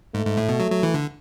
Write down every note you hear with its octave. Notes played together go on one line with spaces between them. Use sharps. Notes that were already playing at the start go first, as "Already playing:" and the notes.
G#2 A3
G#2
A2
B2
F#3
F#3
E3
D3